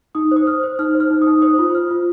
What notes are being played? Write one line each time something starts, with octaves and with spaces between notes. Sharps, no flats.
D#4 D#6
C5
D#6
C5 F6
C5
D#4 F6
C5
F6
D#4
D#6
D#4
C5 D#6
F4
C5 F6
F4